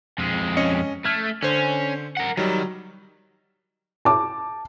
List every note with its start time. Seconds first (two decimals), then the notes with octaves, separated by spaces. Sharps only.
0.18 F2 G#3
0.57 C#4 D#5 C#7
1.05 A3 F6 G#6
1.42 D3 C#4 C5
2.17 A#4 F#5
2.37 D#3 F#3 G3
4.05 A5 D6